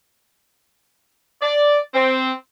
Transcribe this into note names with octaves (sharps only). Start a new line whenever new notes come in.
D5
C4